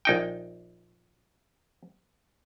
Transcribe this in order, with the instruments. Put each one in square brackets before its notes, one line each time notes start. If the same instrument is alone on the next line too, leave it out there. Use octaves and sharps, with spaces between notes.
[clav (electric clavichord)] A#1 D#4 G5